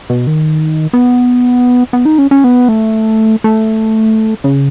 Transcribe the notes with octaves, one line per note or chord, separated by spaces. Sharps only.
B2
D#3
B3
B3
D#4
C#4
C#4
B3
A3
A3
C#3